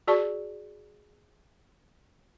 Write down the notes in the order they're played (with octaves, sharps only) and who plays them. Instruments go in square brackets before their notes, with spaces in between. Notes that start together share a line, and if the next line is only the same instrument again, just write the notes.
[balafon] F#4 G#4 D5 A5 C#6